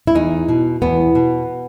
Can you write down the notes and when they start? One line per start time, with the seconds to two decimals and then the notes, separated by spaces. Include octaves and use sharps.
0.07 E4
0.15 E2 D#4
0.49 B2
0.82 E2 B3
1.15 B2